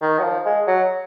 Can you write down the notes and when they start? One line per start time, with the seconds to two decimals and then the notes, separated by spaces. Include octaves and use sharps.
0.02 D#3
0.19 F#3
0.24 F3
0.45 G#3
0.67 F#3